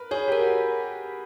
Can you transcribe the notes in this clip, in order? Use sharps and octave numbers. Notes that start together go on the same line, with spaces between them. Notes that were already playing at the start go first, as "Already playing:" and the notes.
Already playing: A#4 B4
G#4 C#5
G4 A#4
F#4